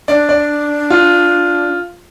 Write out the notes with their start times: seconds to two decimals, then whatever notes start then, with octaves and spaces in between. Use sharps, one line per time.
0.08 D4 D5
0.29 D5
0.90 F4